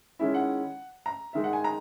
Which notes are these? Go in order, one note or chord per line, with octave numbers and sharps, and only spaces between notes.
D#3 G#3 C#4 E4 E5
F#5
A#5
D#3 G#3 D#4 E5
F#5
G#5
A#5